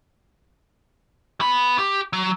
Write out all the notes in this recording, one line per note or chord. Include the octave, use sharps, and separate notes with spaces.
B3 B5
G4
F#3